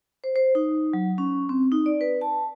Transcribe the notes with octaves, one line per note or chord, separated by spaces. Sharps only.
C5
C5
D#4
F#3
C#4
C4
D#4
D5
B4
A5